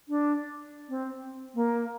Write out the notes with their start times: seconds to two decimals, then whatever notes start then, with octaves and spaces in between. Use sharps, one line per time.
0.09 D4
0.89 C4
1.55 A#3